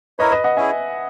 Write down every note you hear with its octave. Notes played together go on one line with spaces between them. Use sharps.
E4 A#4 B4 C#5 D#5
B4 D#5
D#5 F#5
C#4 E4 G#4 E5 G#5